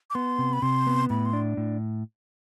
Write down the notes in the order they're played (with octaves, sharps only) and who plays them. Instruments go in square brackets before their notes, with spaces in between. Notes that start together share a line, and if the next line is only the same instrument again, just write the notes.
[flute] D6
[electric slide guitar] B3 [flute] C6
[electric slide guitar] C3
[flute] B5
[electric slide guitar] C3 [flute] C6
[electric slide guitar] B3
[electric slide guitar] A2 [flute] B5
[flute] C6
[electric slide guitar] D4
A2